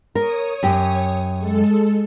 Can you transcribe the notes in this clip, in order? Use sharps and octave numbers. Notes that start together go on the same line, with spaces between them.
A#4 C#5 D#6
F#2 G4
G#3 A4